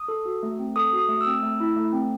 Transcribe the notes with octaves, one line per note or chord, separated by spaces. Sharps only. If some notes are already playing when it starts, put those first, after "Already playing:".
Already playing: D#6
A4
F#4
A3
C4
A4 D#6
F#4 D#6
A3
E6
C4
A3
E4
A3
C4